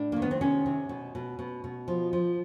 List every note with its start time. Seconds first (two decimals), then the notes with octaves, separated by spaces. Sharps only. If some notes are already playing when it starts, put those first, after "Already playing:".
Already playing: A2 D4
0.12 D#3 A#3
0.22 B3
0.31 C4
0.41 C3 C#4
0.66 C3
0.89 B2
1.15 B2
1.39 B2
1.64 B2
1.88 F3
2.13 F3